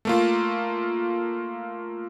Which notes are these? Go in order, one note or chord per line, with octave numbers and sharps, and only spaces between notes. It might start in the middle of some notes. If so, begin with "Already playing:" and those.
A3 A#3 F4